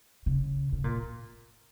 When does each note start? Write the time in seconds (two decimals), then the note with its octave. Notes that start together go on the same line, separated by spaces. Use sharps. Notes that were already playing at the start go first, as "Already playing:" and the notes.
0.26 C#3
0.73 C#3
0.84 A#2